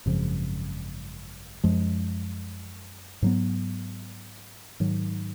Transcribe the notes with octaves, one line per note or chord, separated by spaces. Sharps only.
G#1 F#2 C#3 F3
F#2 F3 G#3
G#2 F#3 B3
G#2 D#3 F#3